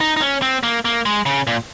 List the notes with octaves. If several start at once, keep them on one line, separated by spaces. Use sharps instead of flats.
D#4
D#4
C#4
C4
A#3
A#3
G#3
C#3
A#2